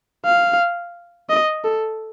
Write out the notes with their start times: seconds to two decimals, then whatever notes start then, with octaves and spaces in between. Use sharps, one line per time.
0.25 F5
1.29 D#5
1.64 A4